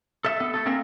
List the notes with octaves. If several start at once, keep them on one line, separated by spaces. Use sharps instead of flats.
A4 E5
B3 A4
A3 A4
A#3 C4 G#4 A#4 E5